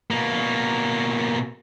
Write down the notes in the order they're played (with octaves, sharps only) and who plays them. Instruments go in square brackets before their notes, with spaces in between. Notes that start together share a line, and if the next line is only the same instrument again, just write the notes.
[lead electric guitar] B2 A#3